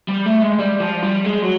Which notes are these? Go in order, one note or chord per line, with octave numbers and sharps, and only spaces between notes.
G3
A3
G#3
G3
F3
G3
G#3
F#3